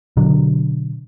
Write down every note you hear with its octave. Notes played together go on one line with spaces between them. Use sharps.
B2 D3 F#3